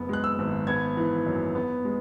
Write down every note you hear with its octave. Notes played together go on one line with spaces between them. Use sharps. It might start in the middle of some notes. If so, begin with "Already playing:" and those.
Already playing: F#1 B3
G#3 F#6
E6
G#1
B3 G#6
E3
F#2
B3
G#3